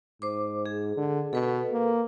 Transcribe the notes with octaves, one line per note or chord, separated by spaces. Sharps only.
G#2 C5 D6
G#4
D3
B2 A4 B4
A#3